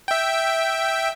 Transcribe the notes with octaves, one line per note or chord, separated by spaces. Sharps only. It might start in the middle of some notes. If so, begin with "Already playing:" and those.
E5 G5